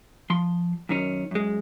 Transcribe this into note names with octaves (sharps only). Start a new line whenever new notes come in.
F3 C6
F#2 D#3 C#4
F#2 G#3